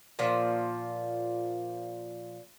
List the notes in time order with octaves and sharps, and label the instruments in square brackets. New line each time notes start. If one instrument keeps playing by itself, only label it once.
[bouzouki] A#2 F3